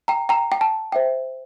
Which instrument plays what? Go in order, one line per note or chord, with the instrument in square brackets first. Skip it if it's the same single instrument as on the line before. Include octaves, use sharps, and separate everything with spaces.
[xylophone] G5 A#5
G5 A#5
G5
A5
C5 E5 G5